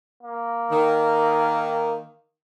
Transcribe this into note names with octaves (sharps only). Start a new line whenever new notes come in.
A#3
D#3